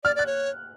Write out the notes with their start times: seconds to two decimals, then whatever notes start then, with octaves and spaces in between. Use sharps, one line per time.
0.04 D5 F6
0.16 D5 F#6
0.26 C#5